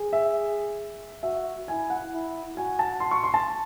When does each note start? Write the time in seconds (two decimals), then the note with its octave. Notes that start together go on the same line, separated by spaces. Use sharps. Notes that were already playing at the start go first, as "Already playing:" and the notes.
Already playing: G#4
0.13 E5
1.23 F#4 E5
1.68 E4 G#5
1.90 F#5
2.12 E4
2.57 F#4 G#5
2.79 A5
3.00 C6
3.11 C#6
3.24 C6
3.34 A5